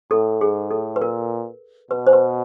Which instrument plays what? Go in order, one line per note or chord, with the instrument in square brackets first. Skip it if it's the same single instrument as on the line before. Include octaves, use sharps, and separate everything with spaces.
[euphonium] A2 [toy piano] A4
[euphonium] G#2 [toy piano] G#4
[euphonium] A2 [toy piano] A4
[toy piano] B4
[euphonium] A#2 [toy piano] A#4
[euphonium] B2 [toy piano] B4
[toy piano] C5
B4